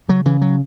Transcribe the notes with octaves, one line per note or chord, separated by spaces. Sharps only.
C#3 F#3
C#3 E3
F#3